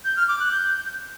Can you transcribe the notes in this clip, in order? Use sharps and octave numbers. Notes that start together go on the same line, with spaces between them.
G6
F6
D6
F#6
G6